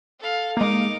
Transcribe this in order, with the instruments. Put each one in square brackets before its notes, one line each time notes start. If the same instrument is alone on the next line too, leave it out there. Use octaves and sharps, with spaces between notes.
[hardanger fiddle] A4 F5
[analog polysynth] G#3 A#3 [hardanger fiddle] D#4 D6